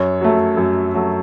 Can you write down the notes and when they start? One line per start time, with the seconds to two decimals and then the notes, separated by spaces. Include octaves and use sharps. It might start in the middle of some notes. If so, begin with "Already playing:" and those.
Already playing: F#2 C#5
0.21 F#3 A3
0.57 F#2
0.94 F#3 A3